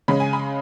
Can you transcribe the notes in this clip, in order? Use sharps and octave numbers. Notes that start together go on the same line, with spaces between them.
C#3 G#3 C#4 B5
G#5
B5